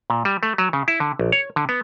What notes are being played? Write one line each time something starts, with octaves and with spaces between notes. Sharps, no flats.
A#2
G3
A3
F#3
C#3
E4
D3
A#1
C#5
D3
B3